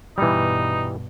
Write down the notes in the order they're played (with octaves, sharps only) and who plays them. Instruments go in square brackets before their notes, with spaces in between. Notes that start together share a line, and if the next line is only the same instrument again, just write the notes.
[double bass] G2 B2 [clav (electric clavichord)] E3 G3 [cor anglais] D#4